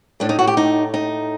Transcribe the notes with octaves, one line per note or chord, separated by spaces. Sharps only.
A2 A3 D4
D#4
F#4
G4
D#4
D#4